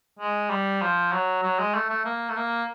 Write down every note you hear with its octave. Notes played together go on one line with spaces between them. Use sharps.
G#3
G3
F3
F#3
F#3
G#3
A3
A3
A#3
A3
A#3